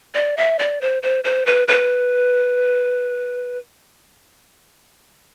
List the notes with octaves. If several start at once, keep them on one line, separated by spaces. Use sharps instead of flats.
D5
E5
D5
C5
C5
C5
B4
B4